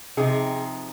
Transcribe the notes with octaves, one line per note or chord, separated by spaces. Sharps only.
C3 F3 C4 D#4 G#4